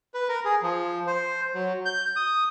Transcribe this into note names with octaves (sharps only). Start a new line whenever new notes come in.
B4
A#4
G#4
F3
C5
F#3
G6
D#6